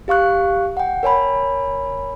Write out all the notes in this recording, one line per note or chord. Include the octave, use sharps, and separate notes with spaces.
G4 F5 C#6 F#6
F#5 G5
A#4 C#5 G#5 B5